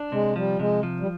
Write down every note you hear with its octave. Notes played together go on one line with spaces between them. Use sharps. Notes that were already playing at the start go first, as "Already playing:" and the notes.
Already playing: D4
C3 G#3
F3 G3
C3 G#3
F3
G3